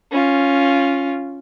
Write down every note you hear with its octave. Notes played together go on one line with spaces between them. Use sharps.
C#4 F4